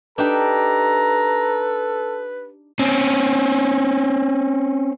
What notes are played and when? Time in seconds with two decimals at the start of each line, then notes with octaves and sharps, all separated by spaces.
0.18 D4 D#4 G4 A4 B4 A#5
2.79 C4 C#4